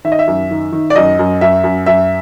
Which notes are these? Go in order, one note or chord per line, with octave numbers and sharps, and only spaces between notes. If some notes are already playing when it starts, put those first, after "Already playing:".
D#3 E5
D#5
E5
F#2
D#3
D#3
D5
F#2 D#5
F#2
F#2 E5
F#2
F#2 E5